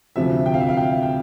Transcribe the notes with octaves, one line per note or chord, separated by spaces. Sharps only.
D2 C3 F3 E5
G5
F5
E5
F5
G5
G5